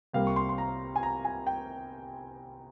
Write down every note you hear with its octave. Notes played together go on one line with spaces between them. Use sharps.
C2 C3 G3 A#3 F5
C#6
C6
C6
A#5
G#5
A#5
G#5
G5